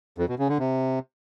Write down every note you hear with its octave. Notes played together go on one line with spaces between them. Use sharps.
F2
B2
C#3
D3
C3